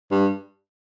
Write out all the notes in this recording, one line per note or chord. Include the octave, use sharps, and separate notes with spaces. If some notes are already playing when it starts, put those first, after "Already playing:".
G2